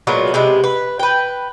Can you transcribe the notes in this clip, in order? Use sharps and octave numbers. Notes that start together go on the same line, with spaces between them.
A#2 F#3 G#3 B3
C3 G#3 B3
B4
B4 G5